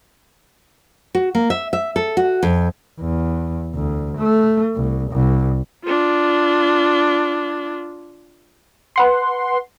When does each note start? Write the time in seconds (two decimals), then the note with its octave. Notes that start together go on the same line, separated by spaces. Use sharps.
1.15 F#4
1.35 A#3
1.50 E5
1.73 E5
1.96 A4
2.17 F#4
2.43 F2
3.00 E2
3.75 D2
4.18 A3
4.77 C2
5.12 C2
5.84 D4 F4
8.96 B4 F#5 C6